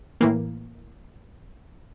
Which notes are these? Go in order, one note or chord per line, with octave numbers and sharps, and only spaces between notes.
A2 E3 A#3